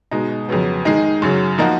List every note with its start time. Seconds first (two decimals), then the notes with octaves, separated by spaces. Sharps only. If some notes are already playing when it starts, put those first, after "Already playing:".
0.11 B2 G#3 D#4
0.49 F2 C#3 F#3 B3
0.85 D#3 G#3 D#4 G#4
1.22 F#2 C#3 F#3
1.58 F3 A#3 D#4 F#4